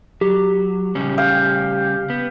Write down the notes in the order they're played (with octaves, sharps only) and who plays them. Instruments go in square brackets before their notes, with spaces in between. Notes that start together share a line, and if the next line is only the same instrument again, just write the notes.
[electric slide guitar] F#3 [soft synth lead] G4
[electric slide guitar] C#3 G3 C#4
[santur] F5 G5
[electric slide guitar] B3